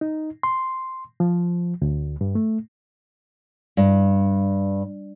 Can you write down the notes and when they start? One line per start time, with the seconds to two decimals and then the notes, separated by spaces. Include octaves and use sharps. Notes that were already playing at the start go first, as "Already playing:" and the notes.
0.01 D#4
0.43 C6
1.20 F3
1.82 D2
2.21 G2
2.35 A3
3.77 G2